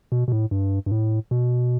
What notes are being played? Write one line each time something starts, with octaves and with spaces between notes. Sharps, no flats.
B2
B2
A2
G2
G2
A2
B2